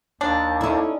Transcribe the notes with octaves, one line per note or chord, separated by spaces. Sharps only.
D#2 D4
C#4 D#4 E4 A4 D5